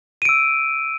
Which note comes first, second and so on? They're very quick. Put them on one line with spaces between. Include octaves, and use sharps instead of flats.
D#7 D7 E6